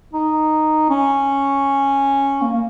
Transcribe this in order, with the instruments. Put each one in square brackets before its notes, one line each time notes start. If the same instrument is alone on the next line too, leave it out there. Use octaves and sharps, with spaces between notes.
[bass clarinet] D#4
C#4
A#3
A#3